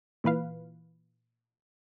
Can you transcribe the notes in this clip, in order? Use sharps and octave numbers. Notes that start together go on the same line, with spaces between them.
A#2 E3 B4 F5